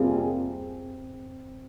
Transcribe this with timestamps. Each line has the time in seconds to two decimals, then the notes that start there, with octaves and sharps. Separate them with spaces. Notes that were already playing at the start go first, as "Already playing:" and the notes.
Already playing: C3 G3 A#3 C4 F4 G#4